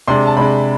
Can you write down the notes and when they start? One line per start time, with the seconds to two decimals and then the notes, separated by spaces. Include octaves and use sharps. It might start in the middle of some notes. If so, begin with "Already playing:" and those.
0.08 C3 G#3 D4 C6
0.27 A5
0.37 C3 G#3 D4 B5